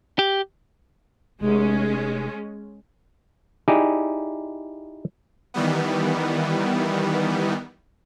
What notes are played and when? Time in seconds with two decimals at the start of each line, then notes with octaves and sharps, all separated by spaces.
0.19 G4
1.41 F1 G#3 C#4
3.68 D#4 E4 G4 G#4 D5
5.54 D#3 E3 G3 B3